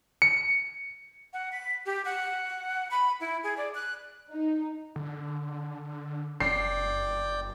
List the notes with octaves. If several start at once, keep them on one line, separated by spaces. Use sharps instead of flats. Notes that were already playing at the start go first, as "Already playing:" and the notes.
C#7
F#5
B6
G4
F#5
B5
E4
G#4
D5
F#6
D#4
D3
F#1 D5 G5 C7